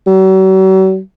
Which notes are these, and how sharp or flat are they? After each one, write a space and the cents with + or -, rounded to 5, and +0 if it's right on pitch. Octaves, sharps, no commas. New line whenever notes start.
F#3 +45